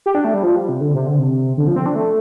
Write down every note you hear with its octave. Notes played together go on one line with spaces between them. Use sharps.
G4
D4
A3
G3
F3
G3
C3
D3
C3
D3
C3
D3
F3
C4
D4
A3